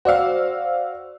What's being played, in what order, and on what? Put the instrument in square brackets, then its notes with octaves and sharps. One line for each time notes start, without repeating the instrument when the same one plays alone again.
[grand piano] F#4 F5 [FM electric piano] C5 D5 E6